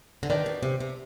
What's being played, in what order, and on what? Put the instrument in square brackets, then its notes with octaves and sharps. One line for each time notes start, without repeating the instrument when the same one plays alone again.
[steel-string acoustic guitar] D3
[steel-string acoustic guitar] D#3 [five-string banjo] D4 G4 B4 D5
[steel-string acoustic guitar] B2
C3
C3